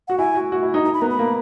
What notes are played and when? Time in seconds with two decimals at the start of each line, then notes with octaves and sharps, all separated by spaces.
0.08 F#4 F#5
0.19 E4 G#5
0.35 F#4
0.52 F#4
0.63 E4
0.74 D#4
0.85 A#5
0.94 B5
1.02 B3 A#5
1.10 B5
1.19 A#3